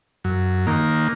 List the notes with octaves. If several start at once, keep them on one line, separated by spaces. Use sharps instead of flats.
F#2
D#3 A#3